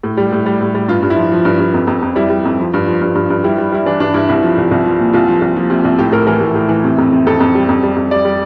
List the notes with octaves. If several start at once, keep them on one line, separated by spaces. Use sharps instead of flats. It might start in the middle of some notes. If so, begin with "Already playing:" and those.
A2
G3
A2
G3
A2
G3
G2 F4
G2
E4
F3
F3
G2
G2
F2
F2
F2
G3 E4
G3
F2
F3
G2
F3
G2
G2
G2
G3 E4
G3
G3 E4
E3 D4
G2 D4
G2 E4
C2 E4
F3
C2
C2
F3
A#2
C2 F4
F3
C2
F3
C3
C2
A2 G4
A2 A#4
E3 A#4
A2
A2
E3
C3
F2
C3
F2 A4
F2
G3
F2
G3
F2
G3 D5
G3